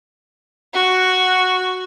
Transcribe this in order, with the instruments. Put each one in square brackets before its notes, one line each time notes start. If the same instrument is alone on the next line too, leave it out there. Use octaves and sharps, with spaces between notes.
[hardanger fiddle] F#4